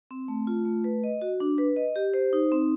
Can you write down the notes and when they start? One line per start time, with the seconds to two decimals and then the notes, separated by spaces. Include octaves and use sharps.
0.11 C4
0.28 A3
0.47 F4
0.65 A3
0.84 B4
1.04 D#5
1.21 F#4
1.40 D4
1.58 B4
1.76 D#5
1.96 G4
2.14 C5
2.33 D#4
2.52 C4